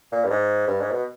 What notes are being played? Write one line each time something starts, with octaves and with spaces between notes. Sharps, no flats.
A#2
G2
G#2
G2
G#2
B2